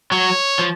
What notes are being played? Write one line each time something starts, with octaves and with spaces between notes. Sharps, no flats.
F#3 C#5
F3